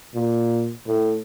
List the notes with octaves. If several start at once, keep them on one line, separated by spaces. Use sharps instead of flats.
A#2
A2